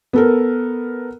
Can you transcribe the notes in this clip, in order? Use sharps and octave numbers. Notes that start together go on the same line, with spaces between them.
B3 A4 A#4